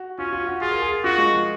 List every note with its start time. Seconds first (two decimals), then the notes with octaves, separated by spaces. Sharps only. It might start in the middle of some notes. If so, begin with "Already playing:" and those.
Already playing: F#4
0.18 C#4 F4
0.33 F4
0.47 F#4
0.61 F4 G#4
0.71 A#4
0.82 G#4
1.04 F4 F#4
1.18 G#3
1.32 F3